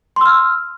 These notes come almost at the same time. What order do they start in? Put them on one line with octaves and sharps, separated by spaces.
C6 E6 F6